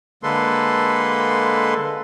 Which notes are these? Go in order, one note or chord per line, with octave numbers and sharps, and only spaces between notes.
D3 G#3 A#3 A4 B4 C6